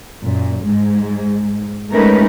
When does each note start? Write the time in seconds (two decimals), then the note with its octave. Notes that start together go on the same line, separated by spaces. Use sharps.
0.23 F#2 A#2
0.64 G#2 G#3
1.90 G#3 A3 C#4 D#4 A#4 B4